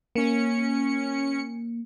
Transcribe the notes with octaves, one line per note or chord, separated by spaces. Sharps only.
A#3 C#4 C#7